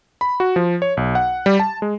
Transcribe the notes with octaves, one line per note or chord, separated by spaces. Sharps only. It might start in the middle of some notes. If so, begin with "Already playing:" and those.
B5
F#4
F3
C#5
B1
F#5
G3
A5
G#3